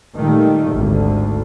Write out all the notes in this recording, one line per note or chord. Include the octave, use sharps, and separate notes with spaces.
A#2 D#3 G3 A3
G#1 D2